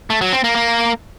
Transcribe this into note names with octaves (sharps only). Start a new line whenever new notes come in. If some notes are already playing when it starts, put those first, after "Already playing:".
A3
F#3
C4
A#3
A#3